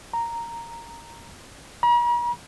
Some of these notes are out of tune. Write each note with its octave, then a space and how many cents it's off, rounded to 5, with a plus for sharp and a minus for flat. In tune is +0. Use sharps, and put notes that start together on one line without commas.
A#5 -5
A#5 +45